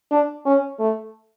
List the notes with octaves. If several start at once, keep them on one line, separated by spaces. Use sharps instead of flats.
D4
C#4
A3